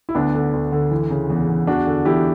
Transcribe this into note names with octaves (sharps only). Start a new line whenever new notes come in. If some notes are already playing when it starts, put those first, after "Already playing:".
E4
D2 B3 D4
D3
D2
D3
E3
C#3
E2
E2
E2 D4 F#4
D3
E2 E4 G4